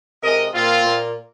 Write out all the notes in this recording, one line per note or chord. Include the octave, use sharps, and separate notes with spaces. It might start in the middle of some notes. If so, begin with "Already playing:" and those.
C3 G#3 A#4 D#5
A#2 A#3 C4 F4
A#2 A#3